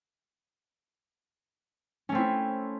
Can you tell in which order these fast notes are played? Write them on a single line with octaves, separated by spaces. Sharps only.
C#4 A3 C4 E4